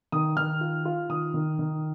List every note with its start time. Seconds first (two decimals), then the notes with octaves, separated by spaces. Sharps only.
0.12 D#3 D#6
0.37 D#3 F6
0.61 F4
0.85 F4
1.10 D#3 D#6
1.34 D#3
1.59 D#3